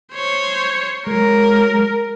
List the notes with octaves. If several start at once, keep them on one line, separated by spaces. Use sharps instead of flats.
C5 C#5
F#3 G#3 A#4